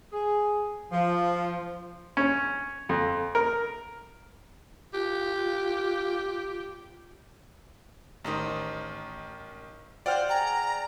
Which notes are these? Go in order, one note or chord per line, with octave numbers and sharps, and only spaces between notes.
G#4
F3
C#4
F2
A#4
F4 G4
A1 D#3 C5 D#5 A#5
F4 F#4 C5 D5 F#5 G5 F6
G#4 G5 A#5